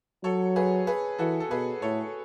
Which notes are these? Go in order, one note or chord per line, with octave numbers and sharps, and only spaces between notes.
F#3 A4 C#5
G#4 B4
G#4 B4
E3 F#4 A4
A4
B2 G#4 B4
A2 A4 C#5